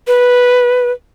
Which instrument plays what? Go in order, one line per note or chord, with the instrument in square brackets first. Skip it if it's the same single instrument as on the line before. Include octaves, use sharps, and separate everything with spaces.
[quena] B4